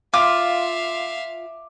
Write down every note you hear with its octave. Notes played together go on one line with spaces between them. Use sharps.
F4 E5 F5 D6